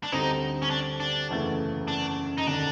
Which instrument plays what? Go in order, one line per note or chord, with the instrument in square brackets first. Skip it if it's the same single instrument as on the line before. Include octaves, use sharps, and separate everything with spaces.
[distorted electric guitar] D4
[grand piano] D2 D3 G3 C4 [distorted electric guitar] D#4
[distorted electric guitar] C#4
D4
D4
[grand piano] F#1 E2 C#3 E3 A3
[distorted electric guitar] D4
D#4
[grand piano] E1 D#2 D3 [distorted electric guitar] D4